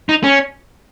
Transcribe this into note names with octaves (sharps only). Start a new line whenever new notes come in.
D#4
C#4